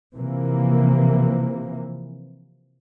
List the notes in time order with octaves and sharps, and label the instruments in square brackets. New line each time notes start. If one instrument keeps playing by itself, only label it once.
[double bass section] C3 E3 F3 A#3